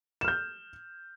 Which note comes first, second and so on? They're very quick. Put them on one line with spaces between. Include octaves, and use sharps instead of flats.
E7 F6 G6